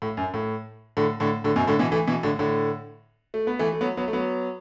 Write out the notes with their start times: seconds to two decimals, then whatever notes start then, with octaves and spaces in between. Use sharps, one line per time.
0.02 A2
0.17 F#2
0.34 A2
0.97 A2 D3
1.20 A2 D3
1.44 A2 D3
1.56 F#2 B2
1.68 A2 D3
1.79 B2 E3
1.92 E3 A3
2.07 B2 E3
2.23 A2 D3
2.39 A2 D3
3.34 A3
3.47 B3
3.59 E3 A3
3.72 A3
3.81 F#3 B3
3.97 F#3 B3
4.08 A3
4.13 F#3 B3